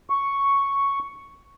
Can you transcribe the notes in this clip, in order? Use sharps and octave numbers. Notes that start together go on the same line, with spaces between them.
C#6